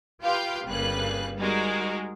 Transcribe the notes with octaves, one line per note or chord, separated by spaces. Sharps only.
F4 G4 B4 F5 G5 C6
G1 C#3 G3 A#3 B4 F#6
G3 G#3 D#4 F#4 A#4